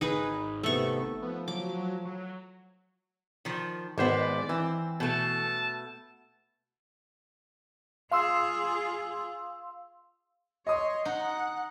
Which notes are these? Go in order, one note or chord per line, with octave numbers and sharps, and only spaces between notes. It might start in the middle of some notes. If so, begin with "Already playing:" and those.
G#1 D#4 G#4 B4
C3 A3 B3 C#6
F3 B3
F#3 D6
F#3
D#3 F3
G#1 G#3 B3 C5 D5
E3 C4
B2 A3 A5
F4 G#4 F5 C6 E6
C#5 D#5 C6 D#6
D#4 F#5